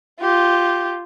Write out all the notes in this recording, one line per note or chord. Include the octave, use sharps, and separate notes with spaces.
F4 G4